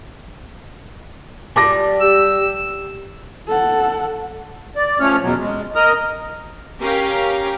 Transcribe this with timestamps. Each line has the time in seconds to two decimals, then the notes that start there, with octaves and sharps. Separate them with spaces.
1.56 G3 A5 D6 A#6
2.01 G4 E6
3.48 A4 F#5
4.76 D5
5.00 F3 A3 C#4 C#5 F6
5.22 E2 B2 F#3
5.39 G#3
5.76 A#4 D#5 A#5 D#6 F6
6.79 C#4 G4 A#4 F5